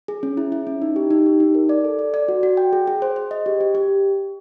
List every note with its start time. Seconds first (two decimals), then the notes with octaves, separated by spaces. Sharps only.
0.08 G#4
0.23 C#4
0.37 E4
0.52 E4
0.67 C#4
0.82 D#4
0.96 G4
1.11 D#4
1.26 G4
1.40 D#4
1.55 A#4
1.69 D5
1.84 A4
1.99 D5
2.14 D5
2.28 F#4
2.43 F#4
2.57 G5
2.73 G#4
2.87 G#4
3.02 C5
3.16 C5
3.31 D#5
3.46 G4
3.61 G4
3.75 G4